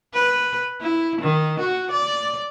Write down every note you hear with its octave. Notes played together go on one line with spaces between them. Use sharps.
B4
E4
D#3
F#4
D5